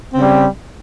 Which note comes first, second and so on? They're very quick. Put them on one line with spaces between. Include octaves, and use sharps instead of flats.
C4 C#3 G3